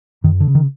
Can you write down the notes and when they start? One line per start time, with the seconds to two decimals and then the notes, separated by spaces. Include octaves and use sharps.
0.24 F#2 D#3
0.40 D3
0.47 C#3
0.55 D#3